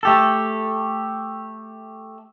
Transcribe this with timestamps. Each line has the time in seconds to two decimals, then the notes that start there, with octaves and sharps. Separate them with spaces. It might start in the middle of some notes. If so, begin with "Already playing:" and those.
0.03 A3 G4 A4